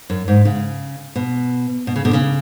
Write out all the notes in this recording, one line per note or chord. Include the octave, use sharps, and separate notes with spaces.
F#2
G#2
C#3
B2
B2
C#3
B2 D3
C#3